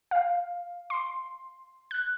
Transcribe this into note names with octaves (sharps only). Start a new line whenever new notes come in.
F5
C6
F#6